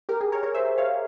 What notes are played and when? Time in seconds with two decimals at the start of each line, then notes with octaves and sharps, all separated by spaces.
0.09 G4 A#4
0.21 G#4
0.32 A#4 C#5
0.43 A#4 C#5
0.54 C5 E5
0.78 C#5 F5